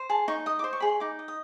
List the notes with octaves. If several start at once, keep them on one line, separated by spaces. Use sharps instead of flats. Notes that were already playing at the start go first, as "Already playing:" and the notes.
Already playing: C5
G#4 A5
D#4 C#6
D#5 D#6
D6
C5
C#6
G#4 B5
C6
D#4 D6
D#5
D#6